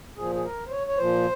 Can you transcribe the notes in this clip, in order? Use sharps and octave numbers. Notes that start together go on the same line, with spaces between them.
A#2 F3 G#4
G#4
A#4
C5
C#5
C#5
A#2 F3 C5